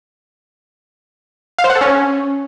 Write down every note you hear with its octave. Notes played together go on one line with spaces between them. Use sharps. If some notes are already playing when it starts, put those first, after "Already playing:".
F5
C5
F#5
A4
C#4